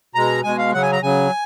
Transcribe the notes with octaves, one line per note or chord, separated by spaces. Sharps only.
B2 G#3 A#5
B2 G#3 G#5
F5
C#3 F#3 F#5
G#5
A#5
C#3 F#3 G#5